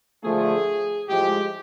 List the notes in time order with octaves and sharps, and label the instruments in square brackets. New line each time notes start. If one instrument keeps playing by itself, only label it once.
[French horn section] D3 F3 A3 [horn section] G#4
[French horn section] A2 F3 G#3 [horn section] G4